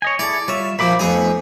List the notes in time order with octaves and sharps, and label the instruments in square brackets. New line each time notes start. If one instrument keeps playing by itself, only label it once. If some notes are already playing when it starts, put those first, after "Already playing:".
[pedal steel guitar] C#5 D#5 G#5
[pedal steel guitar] E4 G#4 A4 [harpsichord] D5
[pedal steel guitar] G3 F4 E5 [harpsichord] C#5
[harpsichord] A#2 F3 [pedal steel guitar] E5 B5 D6
[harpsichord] F2 G#4 G#5 [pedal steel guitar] A3 B3 D#4